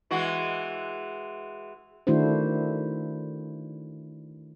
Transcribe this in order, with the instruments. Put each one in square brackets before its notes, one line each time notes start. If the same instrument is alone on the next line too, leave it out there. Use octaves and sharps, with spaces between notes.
[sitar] E3 G#3 F#4
[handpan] D#3 A3 D4 E4 F#4 C5